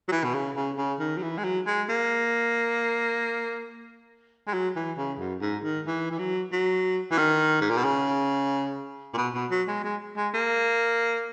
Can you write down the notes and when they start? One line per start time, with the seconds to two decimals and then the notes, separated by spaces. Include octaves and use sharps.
0.08 F#3
0.12 E3
0.24 B2
0.35 C#3
0.56 C#3
0.78 C#3
1.00 D#3
1.18 F#3
1.22 E3
1.38 G#3
1.44 F#3
1.67 G#3
1.89 A#3
4.47 G#3
4.54 F#3
4.76 E3
4.98 C#3
5.19 F#2
5.42 G#2
5.64 D#3
5.87 E3
6.11 E3
6.19 F#3
6.52 F#3
7.11 E3
7.18 D#3
7.61 G#2
7.70 A#2
7.77 B2
7.85 C#3
9.14 A#2
9.17 B2
9.34 B2
9.51 F#3
9.68 G#3
9.84 G#3
10.17 G#3
10.34 A#3